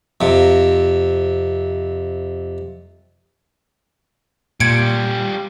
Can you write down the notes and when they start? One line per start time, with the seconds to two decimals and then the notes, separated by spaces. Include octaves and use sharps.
0.21 F2 C3
4.60 A#2 G3 F4 G#6 C#7 D7